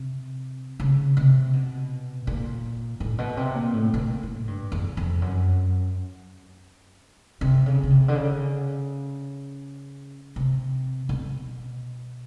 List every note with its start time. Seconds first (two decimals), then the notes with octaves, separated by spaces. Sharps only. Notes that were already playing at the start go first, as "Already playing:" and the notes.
Already playing: C3
0.80 C#3
1.17 C3
1.53 B2
2.27 A#2
3.00 A2
3.18 B2
3.37 C3
3.55 A#2
3.74 A2
3.94 B2
3.98 A#2
4.23 A2
4.47 G2
4.72 E2
4.97 F2
5.22 F#2
7.41 C3
7.66 C#3
7.83 C#3
7.90 C3
8.08 D3
8.15 C#3
10.36 C3
11.09 B2